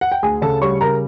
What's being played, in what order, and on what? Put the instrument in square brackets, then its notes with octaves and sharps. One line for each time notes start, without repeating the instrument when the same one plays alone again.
[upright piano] F#5
G5
D2 G#4 G#5
C#3 A4 A5
G3 C#5 C#6
C#3 A#4 A#5